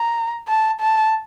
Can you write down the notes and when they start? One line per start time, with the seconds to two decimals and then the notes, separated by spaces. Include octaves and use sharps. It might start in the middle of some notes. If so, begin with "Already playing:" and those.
Already playing: A#5
0.48 A5
0.81 A5